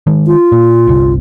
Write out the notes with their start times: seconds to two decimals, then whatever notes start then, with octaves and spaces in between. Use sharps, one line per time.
0.07 D#3 G#3
0.27 F4
0.52 A#2
0.87 G1 C2 C3